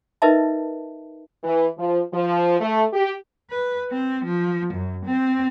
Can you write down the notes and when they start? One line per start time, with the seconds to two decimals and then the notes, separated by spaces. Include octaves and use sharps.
0.22 D#4 A#4 B4 D#5 E5 A5
1.44 E3
1.78 F3
2.14 F3
2.61 A3
2.93 G4
3.51 B4
3.91 C4
4.25 F3
4.74 F#2
5.06 C4